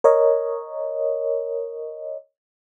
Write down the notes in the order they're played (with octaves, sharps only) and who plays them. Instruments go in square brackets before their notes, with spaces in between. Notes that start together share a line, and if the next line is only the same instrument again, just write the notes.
[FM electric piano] A#4 C#5 D#5